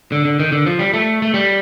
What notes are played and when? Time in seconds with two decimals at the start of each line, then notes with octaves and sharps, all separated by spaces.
0.12 D3
0.25 D3
0.40 D#3
0.52 D3
0.66 F3
0.79 G3
0.93 A3
1.22 A3
1.34 G3